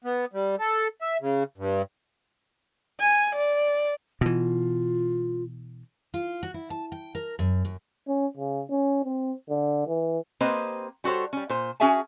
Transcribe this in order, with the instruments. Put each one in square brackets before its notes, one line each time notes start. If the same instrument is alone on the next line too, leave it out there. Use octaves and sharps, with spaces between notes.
[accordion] B3
G3
A4
E5
C#3
G2
[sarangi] G#5
D5
[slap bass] B2 E3 [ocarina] F4
[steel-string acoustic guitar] F4
F#4
E4
A5
G5
A#4
F#2
F#2
[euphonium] C#4
C#3
C#4
C4
D3
E3
[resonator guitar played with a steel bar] A#3 C4 G4 B4 C5 D#5
G3 F#4 A4 C5 C#5
G3 C#4
A#2 C5
C#4 F#4 G#4 E5 G#5 A5